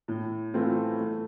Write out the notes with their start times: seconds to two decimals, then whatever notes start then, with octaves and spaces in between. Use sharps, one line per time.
0.08 A2
0.54 E3 A3 C4 F4
1.00 A3